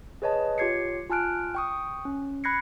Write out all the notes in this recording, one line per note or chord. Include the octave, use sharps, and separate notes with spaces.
G#4 B4 C#5 D#5 A5
F4 G4 C#5 G#6 C7 C#7
F4 G#5 A5 F6 F#6 D7
G5 C#6 D#6
C#4
B5 F#6 G#6 A#6 C7 C#7